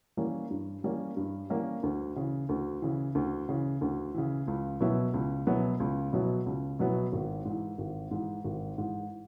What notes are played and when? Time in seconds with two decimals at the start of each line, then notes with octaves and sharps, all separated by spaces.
0.17 E3 G3 A#3 C#4
0.50 G2
0.84 E3 G3 A#3 C#4
1.17 G2
1.50 E3 G3 A#3 C#4
1.83 D2
2.16 C#3 E3
2.49 D2
2.82 C#3 E3
3.15 D2
3.49 C#3 E3
3.81 D2
4.14 C#3 E3
4.47 C#2
4.80 B2 F#3 B3 E4
5.14 C#2
5.47 B2 F#3 B3 E4
5.80 C#2
6.13 B2 F#3 B3 E4
6.46 C#2
6.79 B2 F#3 B3 E4
7.12 G#1
7.45 G#2 E3
7.78 G#1
8.11 G#2 E3
8.44 G#1
8.78 G#2 E3